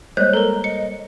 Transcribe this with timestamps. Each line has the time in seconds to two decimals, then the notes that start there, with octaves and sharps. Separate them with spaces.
0.17 G3 G#3 A#3 C5 C#5 D#5 G6
0.33 A4 A#4 A#5
0.64 D#5 C#7